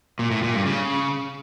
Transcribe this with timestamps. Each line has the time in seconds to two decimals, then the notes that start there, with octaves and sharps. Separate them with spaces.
0.19 A#2
0.31 A2
0.42 A#2
0.54 G2
0.66 C#3